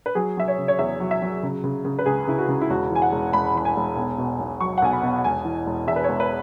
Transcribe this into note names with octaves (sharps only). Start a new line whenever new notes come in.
B4
F#3 G#4
F#3 E5
C#5
C#3
C#5
E2 E5
F#3
E5
F#3
C#3
C#3
C#3
B4
C#2 G#4
C#3 E4
F#4
C#3
E4
E1 F#4
E3
G#5
F#5
E1
E1 B5
E3 B5
G#5
E1
B1
B2
B1
F#3 C#6
F#5
B1 G#5
B5
B2
E1 G#5
E3
E1
E2 E5
B4
E1 C#5
B4